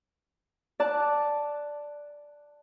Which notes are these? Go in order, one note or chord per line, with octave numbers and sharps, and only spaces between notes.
D5 A5 F#6